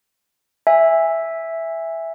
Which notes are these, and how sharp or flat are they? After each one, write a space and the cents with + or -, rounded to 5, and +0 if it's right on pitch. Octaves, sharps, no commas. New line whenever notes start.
E5 +0 G#5 -20